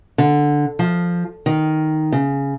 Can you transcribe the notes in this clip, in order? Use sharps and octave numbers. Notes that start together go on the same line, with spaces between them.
D3
F3
D#3
C#3